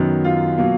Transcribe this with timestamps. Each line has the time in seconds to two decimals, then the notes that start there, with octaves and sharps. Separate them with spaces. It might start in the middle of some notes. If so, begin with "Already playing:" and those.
Already playing: F#2 D#3 F#3 B3
0.24 F4
0.58 B2 F#3 A#3